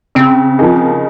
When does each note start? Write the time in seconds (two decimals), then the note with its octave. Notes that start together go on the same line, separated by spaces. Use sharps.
0.15 C#3 C4
0.59 F3 A#3 D#4 G#4